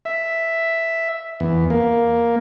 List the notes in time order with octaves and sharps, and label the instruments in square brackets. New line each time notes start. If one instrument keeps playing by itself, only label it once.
[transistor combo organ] E5
E2
A#3